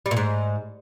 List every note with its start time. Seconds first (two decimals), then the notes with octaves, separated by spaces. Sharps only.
0.06 G3
0.11 A#2
0.17 G#2